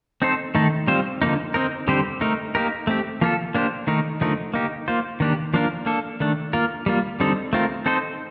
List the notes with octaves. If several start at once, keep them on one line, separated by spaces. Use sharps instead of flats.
C4 D#4 A4 C5
D#3 A3 D#4 A4
G3 C4 F4 C5
D3 F3 A#3 D#4
C4 D#4 A#4
D3 G3 C4 G4 C5
A3 D#4 A#4
A#3 D#4 G4 A#4
A3 C4 G4
F3 A#3 F4 A4
A#3 D4 G4 C5
D#3 A3 D#4 A#4
D3 F3 A3 D#4 A#4
A#3 D#4 G4
A#3 F4 C5
D#3 A#3 D4 G4
F3 A#3 D4 F4 A#4
A#3 D4 A4
D#3 A3 D4
A#3 F4 A#4
G3 A#3 F4
D3 G3 C4 D#4 A4
A3 C4 F4 A#4
C4 D#4 A4 C5